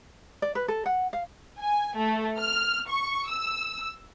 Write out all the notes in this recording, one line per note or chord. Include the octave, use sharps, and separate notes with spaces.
D5
B4
A4
F#5
F5
G#5
A3
F6
C#6
E6